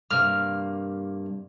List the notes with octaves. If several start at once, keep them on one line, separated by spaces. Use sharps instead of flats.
G2 C3 A#3 F6